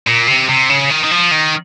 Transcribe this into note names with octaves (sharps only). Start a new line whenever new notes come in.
A#2
C3
C3
C#3
D#3
D#3
F3
D#3